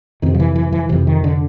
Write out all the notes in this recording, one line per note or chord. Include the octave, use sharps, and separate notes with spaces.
F2 C3 D#3
F3
E3
E3
E3
F2 C3 E3
D#3
D3